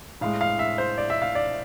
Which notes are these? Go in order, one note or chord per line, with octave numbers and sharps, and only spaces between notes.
A2 G#3 F5
F5
E5
C5
D5
E5
F5
D5